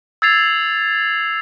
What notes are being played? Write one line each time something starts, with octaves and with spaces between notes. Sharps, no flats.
E6 G#6 A6 C7 F7